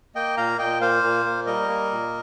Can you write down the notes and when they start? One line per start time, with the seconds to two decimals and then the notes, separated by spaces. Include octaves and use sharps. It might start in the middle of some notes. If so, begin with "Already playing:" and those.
0.15 A#3 D#5 G5
0.37 A#2 F5 A#5
0.59 A#2 D#5 G5
0.81 A#3 C5 F5
1.03 A#2
1.25 A#3
1.46 G3 A#4 D#5
1.69 A#3
1.91 A#2